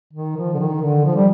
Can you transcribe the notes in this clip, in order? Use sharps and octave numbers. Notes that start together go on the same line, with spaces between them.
D#3
F3
D3
D#3
D3
F3
G3